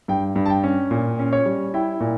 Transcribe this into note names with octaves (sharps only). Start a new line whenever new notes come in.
G2 G5
G2
A5
G5
C#4
A#2
C#4
C#5
G3
E4 G5
A#2